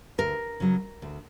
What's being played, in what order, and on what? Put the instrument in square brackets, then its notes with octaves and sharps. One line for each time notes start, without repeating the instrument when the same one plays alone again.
[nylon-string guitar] D2 A#4
C#3 F#3
D2